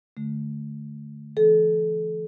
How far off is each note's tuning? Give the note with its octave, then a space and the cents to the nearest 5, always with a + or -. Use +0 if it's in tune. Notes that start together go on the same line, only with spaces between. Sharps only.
D3 +0 A3 -15
E3 +40 A4 -30